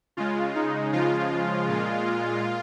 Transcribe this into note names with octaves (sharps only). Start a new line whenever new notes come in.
C#3 G#3 F4
D#4
C#3 F3 G#3 F4
A#2 G#3